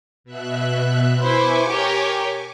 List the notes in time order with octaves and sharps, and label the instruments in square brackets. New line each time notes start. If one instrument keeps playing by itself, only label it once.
[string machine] B2 E5 F#6
[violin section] E4 B4 C5 [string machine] G#5 C#6 D6
[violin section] G4 A#4 C#5